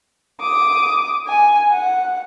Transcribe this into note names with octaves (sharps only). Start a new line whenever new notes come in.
D6 D#6
G#5
F#5